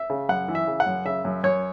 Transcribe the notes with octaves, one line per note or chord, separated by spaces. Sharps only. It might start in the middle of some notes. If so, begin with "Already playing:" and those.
Already playing: E5
C#3
F#2 F#5
E3
E5
C#3
F#5
F#2
C#3 E5
F#2
F#2 C#5